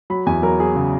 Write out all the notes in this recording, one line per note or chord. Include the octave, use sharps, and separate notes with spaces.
F#3 B5
E2 G#5
F#3 A#4
F#3 G#4
C#3